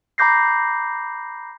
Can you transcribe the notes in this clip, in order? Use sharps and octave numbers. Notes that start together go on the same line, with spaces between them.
A#5 B5 D6 G6 A#6 C7